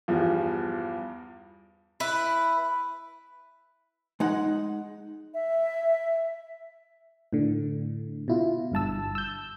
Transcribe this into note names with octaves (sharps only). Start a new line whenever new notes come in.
E2 G2 F3
E4 B4
G#3 D#4 F#5
E5
A2 D3
B2 E4 F4
G1 G2 A5 E6
E6 G6